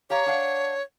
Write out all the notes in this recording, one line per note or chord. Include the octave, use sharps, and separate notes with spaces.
G4 C#5 F5 A#5
D4 F5 F#5